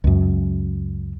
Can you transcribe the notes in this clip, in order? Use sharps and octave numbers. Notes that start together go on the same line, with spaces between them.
C#2 F#2